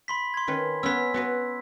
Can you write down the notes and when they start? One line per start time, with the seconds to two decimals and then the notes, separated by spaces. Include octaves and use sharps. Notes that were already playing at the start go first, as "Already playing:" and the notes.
0.08 B5 C6 B6
0.34 C6 G#6
0.48 D#3 C#4 B4
0.83 B3 C#4 E6 B6
1.14 B3 F#4 B4